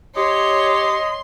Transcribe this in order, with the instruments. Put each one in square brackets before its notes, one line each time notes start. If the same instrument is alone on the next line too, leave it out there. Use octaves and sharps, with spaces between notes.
[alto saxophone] G4 [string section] C#5 [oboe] D#5 [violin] C6